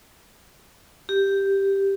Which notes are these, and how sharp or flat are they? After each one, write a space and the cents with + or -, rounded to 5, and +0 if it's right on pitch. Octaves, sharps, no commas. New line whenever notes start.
G4 +0